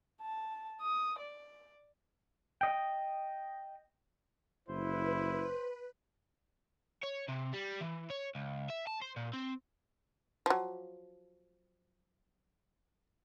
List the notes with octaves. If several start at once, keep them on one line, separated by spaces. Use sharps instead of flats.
A5
D#6
D5
D#5 G5
F#1 E4 B4 C5
C#5
C3
G3
E3
C#5
C#2
E5
A5
C5
A#2
C4
F3 F#3